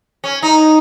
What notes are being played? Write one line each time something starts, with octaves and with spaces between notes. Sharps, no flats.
C#4
D#4